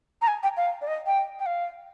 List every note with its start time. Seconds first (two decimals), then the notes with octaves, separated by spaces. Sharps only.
0.22 A#5
0.28 G#5
0.43 G5
0.57 F5
0.81 D5
0.87 D#5
1.06 G5
1.39 G5
1.46 F5